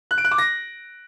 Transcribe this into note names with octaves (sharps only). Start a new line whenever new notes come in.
F#6
D7
F#6
D6
A#6